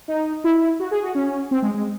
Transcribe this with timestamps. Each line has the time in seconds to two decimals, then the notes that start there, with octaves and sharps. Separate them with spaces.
0.08 D#4
0.44 E4
0.80 F#4
0.91 G#4
1.03 F#4
1.15 C#4
1.51 C4
1.62 G#3
1.74 G#3